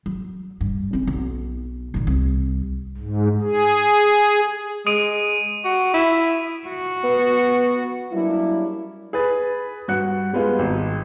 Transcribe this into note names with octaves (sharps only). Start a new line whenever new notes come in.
F#3
G2
C4 C#4
B1
A#2 D#3
C2
G#2
G#4
G#3 D#6 D7 D#7
F#4
E4
F#4
B3
F#3 G3 A#3 C#4 D4 E4
G#4 B4 A6
G2 F#4 F#6 C#7
G3 G#3 B3 F4
G#1